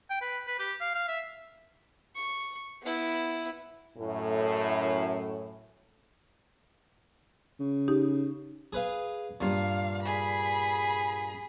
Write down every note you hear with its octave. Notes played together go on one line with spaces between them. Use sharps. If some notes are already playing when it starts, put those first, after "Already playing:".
G5
B4
B4
G4
F5
F5
E5
C#6
B3 E4
F#2 A2
C#3
D#4 G4
G#4 B4 F5
G2 A#2 F5
G#4 B5